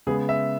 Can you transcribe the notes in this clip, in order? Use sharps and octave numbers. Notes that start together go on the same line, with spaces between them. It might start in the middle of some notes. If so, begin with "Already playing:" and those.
C#3 G#3 B3 G#4
E5